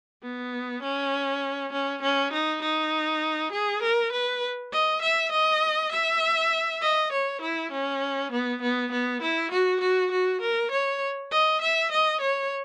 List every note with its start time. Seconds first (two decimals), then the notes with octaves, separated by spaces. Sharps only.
0.23 B3
0.83 C#4
1.73 C#4
2.02 C#4
2.33 D#4
2.62 D#4
3.52 G#4
3.82 A#4
4.12 B4
4.72 D#5
5.02 E5
5.32 D#5
5.92 E5
6.82 D#5
7.12 C#5
7.41 E4
7.71 C#4
8.32 B3
8.62 B3
8.92 B3
9.22 E4
9.51 F#4
9.81 F#4
10.11 F#4
10.41 A#4
10.71 C#5
11.31 D#5
11.61 E5
11.91 D#5
12.21 C#5